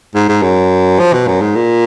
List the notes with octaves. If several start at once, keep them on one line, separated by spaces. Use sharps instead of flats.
G#2
G#2
F#2
F3
B2
F#2
G#2
A#2